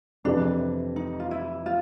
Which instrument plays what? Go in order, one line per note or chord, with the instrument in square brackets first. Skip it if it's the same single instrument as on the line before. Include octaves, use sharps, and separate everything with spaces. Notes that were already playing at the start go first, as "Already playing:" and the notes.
[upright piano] F2 C3 E3 [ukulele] D4
[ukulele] D#4
F4
E4
F4